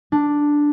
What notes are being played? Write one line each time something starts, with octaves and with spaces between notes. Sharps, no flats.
D4